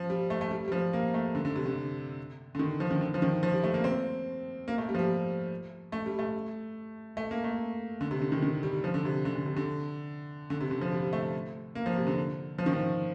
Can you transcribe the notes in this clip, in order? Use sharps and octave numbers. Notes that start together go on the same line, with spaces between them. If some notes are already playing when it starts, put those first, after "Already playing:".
Already playing: F3
G3
A3
A3
G3
G3
F3
A#3
A3
D3
D3
C3
D3
D3
D#3
F3
D#3
D3
F3
D#3
F3
G3
A3
A#3
C4
A#3
A3
G3
F3
G3
A3
G3
A3
A3
A#3
A3
D3
C3
D3
D#3
D#3
G3
F3
D3
C3
D3
D3
C3
D3
D3
C3
D3
F3
G3
A3
A#3
F3
C3
D3
F3
D#3
F3